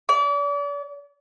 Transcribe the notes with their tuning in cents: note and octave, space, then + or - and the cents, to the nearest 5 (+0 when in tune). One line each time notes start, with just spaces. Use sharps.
D5 -40